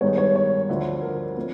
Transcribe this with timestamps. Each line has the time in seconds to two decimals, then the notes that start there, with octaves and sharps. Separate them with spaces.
0.01 G2 D#3 G#3 B3 D#4 C#5
0.18 C#5
0.36 C#5
0.69 D2 D3 F3
1.02 A#4
1.37 F3 A3 C4